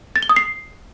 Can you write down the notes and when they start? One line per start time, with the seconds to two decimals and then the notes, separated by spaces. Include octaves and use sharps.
0.16 A6
0.23 G7
0.29 D#6
0.36 C7